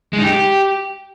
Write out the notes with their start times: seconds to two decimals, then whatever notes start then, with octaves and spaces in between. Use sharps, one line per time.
0.13 G#3
0.18 D#4
0.23 G4